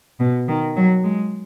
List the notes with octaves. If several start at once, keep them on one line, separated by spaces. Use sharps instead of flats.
B2
D#3
F#3
G#3